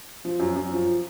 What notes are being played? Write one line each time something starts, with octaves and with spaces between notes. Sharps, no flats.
F3
F#2
F#2
F3